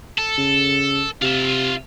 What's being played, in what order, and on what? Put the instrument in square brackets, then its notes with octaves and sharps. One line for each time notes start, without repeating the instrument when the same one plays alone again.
[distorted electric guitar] A4
[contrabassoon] C#3
[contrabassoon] C3 [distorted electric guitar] F4 E5